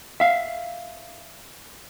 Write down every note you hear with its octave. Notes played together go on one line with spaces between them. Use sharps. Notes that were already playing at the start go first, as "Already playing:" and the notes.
E5 F5